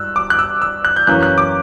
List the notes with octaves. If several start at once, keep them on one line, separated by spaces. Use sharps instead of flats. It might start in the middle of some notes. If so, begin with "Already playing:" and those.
Already playing: G2 E6 F#6
D6
F#6
E6
E6
F#6
G6
F#2 E3 A#3 C#4 F#6
F#6
D6